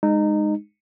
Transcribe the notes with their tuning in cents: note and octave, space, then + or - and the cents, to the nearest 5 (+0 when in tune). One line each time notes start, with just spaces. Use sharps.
G#3 +0 D#4 -20